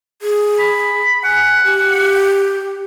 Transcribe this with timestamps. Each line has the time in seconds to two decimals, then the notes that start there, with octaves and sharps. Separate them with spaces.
0.22 G#4
0.59 B5
1.24 F#5 G#5
1.64 G4